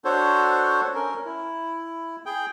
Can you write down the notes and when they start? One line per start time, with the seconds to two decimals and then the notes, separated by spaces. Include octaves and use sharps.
0.05 D4 F#4 A4 C5 C#5
0.94 C#4 A#4
1.25 E4
2.26 G#4 G5